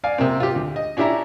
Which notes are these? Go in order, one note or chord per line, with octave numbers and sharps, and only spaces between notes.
D5 F5 G#5
C3 A#3 C4
F4 G4
D2
D#5
C#4 D4 E4 G4 E5 A#5